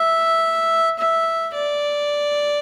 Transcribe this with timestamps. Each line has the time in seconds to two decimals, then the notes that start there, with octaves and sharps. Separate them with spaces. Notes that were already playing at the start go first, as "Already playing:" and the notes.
Already playing: E5
0.99 E5
1.55 D5